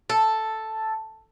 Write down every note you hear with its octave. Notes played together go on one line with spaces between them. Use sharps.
A4